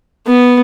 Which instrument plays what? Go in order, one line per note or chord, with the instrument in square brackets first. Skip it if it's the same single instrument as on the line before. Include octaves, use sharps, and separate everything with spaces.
[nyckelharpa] B3